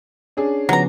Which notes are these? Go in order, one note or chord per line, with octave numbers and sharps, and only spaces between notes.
C#4 D4 G#4
C#3 F3 F#3 B3 A#5